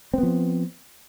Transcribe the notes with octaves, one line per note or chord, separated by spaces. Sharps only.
F3 B3 C4